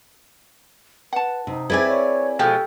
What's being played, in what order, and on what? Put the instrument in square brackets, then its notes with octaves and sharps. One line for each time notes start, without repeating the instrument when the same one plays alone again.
[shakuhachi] B4 [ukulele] F#5 A5
[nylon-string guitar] C3 [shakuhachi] D#4
[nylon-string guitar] C4 G#4 B4 [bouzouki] E4 D5 G#5
[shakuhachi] C#5
[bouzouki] B2 F3 G#3 [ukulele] G4 [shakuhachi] A4